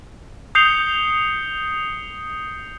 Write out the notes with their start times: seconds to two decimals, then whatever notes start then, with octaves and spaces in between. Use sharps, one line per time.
0.55 D#6 G6 C7 C#7 F7 G7